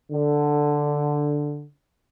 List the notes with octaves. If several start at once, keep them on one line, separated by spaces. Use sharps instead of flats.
D3